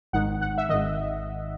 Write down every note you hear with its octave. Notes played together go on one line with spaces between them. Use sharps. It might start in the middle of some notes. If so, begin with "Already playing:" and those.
G#1 G#2 D#3 F#5
F#5
E5
G#1 G#2 D#3 D#5